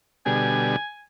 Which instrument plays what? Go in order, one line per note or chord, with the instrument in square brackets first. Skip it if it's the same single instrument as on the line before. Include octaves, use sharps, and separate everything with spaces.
[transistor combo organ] B2 D3 G3 [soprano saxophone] G#5